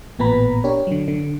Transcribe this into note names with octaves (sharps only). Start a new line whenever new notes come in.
A1 A#2 B3 B4 A#5 B5
D4 G4 A#4 C#5
D3 F#3
D3